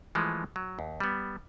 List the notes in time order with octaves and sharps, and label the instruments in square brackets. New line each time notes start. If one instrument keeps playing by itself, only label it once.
[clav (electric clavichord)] E3 F3 G#3 A3
F#3
D#2
G3 B3